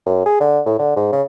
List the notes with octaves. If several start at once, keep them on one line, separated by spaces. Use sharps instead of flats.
F#2
G#4
D3
A2
D3
G#2
C#3